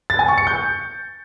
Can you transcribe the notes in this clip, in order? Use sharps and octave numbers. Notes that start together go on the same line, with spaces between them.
A6
G#5
C#6
C#7
G6